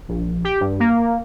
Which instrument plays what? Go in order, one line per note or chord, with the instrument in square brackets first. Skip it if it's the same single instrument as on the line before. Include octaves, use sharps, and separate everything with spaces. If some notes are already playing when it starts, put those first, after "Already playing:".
[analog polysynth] A#1
G4
G2
A#3